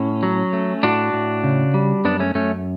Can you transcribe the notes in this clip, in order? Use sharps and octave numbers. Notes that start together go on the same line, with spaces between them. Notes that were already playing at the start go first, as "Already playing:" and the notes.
Already playing: A2 C#4
F#3
A3
A2 D4 F#4
A2
C#3
G3
F#2 B3 D4
A3 C#4
F#2 A3 C#4